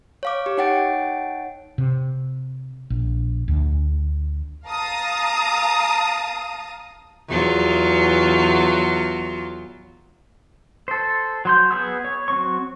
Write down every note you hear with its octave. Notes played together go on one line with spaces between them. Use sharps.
C#5 F5 D6
G4
D#4 C#5 F#5 G5 A6 D7
C3
A#1
D2
F5 A5 A#5 D#6
E2 F#3 F4
A4 C5
F#3 C6 G6
B3 G#4 B5 E6
C#5
F#3 C4 C#6